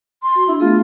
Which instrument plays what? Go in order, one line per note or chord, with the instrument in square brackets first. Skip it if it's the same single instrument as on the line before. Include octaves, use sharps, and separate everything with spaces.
[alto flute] C6
[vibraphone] F#4
[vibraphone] D4 [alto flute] E4
[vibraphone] A3 B3 G#4 [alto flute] F4